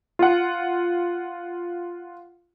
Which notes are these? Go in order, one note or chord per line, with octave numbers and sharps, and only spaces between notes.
F4 F#5